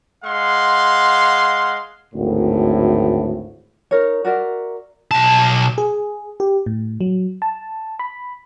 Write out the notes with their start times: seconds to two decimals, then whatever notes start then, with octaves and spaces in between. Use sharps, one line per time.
0.23 G#3 F5 F#5 C6
2.13 G#1 D2 A2
3.91 D#4 A#4 C#5
4.25 F#4 A#4 D5 E5
5.11 B1 A5
5.78 G#4
6.40 G4
6.66 A2
7.01 F#3
7.42 A5
7.99 B5